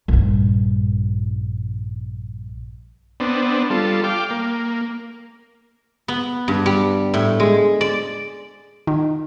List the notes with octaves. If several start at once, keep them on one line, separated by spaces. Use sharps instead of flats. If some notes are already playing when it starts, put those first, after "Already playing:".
A#1 G2
B3 C4 D4
G3 F4 A4
F5 G5 D6
A#3
B3
G2
G3
A2
G#3
D5
D#3